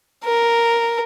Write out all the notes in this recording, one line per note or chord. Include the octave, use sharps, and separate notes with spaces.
A#4